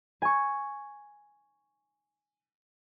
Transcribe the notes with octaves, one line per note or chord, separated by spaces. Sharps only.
G#5 C#6